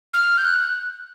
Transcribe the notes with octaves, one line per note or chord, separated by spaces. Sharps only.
F6
G6
F#6